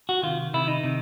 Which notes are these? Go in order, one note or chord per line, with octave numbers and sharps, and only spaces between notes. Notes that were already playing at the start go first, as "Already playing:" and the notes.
F#4
C3 D#3 F4
C3 D#3 E4
D#4
C3 D#3